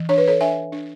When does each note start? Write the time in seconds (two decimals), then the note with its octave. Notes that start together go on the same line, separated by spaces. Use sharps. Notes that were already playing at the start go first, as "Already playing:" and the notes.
Already playing: E3
0.09 D4 C#5
0.18 B4
0.27 A4 C#5
0.41 D4 E5 G#5
0.72 D4